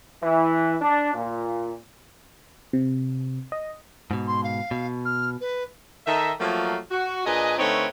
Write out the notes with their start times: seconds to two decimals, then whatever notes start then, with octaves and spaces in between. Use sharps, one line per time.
0.23 E3
0.80 D4
1.14 A#2
2.73 C3
3.52 D#5
4.11 G#2 B2
4.27 C6
4.43 F5
4.71 B2
5.05 F6
5.41 B4
6.06 D#3 D#4 A4 E5
6.39 F3 F#3 A3 A#3
6.91 F#4
7.25 A#2 D4 G#4 B4 D#5
7.59 D3 A3 C4 D#4 B4 C#5